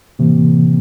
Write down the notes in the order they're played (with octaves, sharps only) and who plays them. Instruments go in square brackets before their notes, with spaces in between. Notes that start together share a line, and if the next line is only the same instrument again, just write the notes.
[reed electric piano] A2 E3 A#3 [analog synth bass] C3